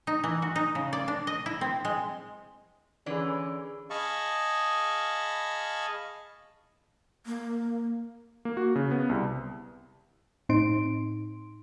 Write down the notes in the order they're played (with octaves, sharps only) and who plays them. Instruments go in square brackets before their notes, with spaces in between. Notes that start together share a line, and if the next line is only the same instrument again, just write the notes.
[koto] D#4
E3
F#4
D#4
C#3
D5
D4
D#5
E4
C4
G#3
[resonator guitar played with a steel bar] D3 E3 B4 [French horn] C#4 [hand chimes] G#4 D5
[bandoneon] G#4 D#5 F5 A5 B5 C#6
[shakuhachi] A#3
[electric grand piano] A#3
F#4
C#3
B3
C2
[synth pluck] A2 C4 D#4 C6 D7